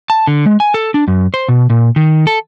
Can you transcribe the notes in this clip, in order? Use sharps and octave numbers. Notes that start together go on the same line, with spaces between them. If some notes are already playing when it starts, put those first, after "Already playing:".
A5
D3
G#3
G#5
A4
D4
F#2
C5
B2
A#2
D#3
A4